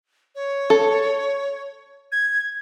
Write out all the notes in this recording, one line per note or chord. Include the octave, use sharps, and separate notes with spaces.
C#5
A4
G#6